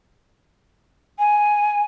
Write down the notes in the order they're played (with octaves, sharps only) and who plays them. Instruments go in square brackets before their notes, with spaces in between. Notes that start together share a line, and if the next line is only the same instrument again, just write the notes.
[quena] G#5